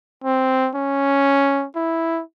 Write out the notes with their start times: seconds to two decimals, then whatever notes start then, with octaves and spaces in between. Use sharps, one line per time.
0.24 C4
0.75 C#4
1.76 E4